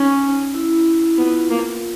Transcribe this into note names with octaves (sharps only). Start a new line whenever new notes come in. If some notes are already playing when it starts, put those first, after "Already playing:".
Already playing: C#4 D#4
E4
B3 F4
E4
F4
A#3